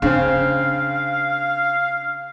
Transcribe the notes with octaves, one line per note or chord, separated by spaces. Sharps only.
C#3 C4 D4 F5